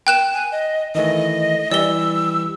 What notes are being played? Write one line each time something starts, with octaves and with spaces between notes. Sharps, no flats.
G5 F#6 E7
G#5
D#5
D#3 E3 A3 D#5
E3 G3 G4 D5 E6 G7